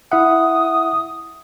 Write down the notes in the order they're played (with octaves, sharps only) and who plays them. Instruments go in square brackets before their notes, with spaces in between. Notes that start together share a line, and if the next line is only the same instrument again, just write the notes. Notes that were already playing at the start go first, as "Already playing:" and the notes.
[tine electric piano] E4 E5 F#5 [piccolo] D#6